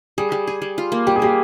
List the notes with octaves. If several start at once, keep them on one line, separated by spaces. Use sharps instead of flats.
G3 G#4
G3
G#4
G3
F4
A#3
G3 G4
G#4
A#3 G4